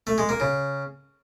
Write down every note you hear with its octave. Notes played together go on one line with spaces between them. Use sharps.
A3
G#3
A#3
C#3